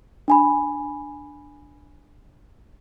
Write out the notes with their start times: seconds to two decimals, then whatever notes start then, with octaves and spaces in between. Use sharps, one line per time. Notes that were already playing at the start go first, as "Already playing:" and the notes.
0.28 D4 G#5 B5